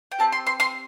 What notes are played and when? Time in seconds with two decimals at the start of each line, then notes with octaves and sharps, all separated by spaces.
0.12 G5
0.19 C4 G4 A5
0.32 C6
0.47 C6
0.60 C6